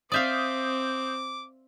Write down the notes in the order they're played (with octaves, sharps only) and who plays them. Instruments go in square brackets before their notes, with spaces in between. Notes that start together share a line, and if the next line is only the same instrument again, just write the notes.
[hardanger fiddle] C4 [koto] D5 E5 F5 [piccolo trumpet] D6 [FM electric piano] D#6 G6